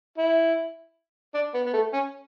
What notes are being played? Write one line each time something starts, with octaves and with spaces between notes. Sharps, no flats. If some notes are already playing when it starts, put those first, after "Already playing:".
E4
D4
B3
B3
A3
C#4